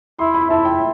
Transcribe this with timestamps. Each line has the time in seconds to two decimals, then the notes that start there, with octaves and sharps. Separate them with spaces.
0.19 E4 C6
0.34 B5
0.50 E4 A5
0.65 G5